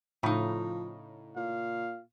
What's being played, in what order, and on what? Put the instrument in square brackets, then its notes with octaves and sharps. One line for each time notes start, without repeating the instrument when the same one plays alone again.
[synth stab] A2 [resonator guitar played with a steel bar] C#3 D#4 [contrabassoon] F3
[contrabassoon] A#2 [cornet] F5